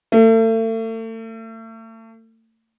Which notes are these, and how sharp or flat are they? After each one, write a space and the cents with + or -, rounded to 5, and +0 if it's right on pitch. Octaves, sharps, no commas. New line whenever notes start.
A3 +35